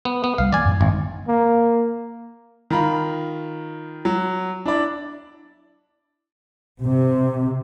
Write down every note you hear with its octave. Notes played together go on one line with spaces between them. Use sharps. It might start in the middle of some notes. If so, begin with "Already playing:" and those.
B3
B3
C2 G3 F5
E3 A#3 D5 G#5
F#2 A2
G#1
A#3
D#3 F4 A#5 B5
F#3
D4 E4 D5
C3